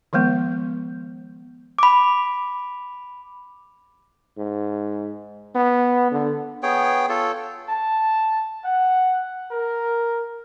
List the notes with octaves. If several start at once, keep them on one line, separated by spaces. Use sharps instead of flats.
D#3 F3 G#3 B3
B5 D6
G#2
B3
D3
B3 G#4 C#5 G5
F4 A4 C#5
A5
F#5
A#4